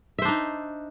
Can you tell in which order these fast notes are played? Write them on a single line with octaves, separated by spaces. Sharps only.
E5 C5 D4 D#4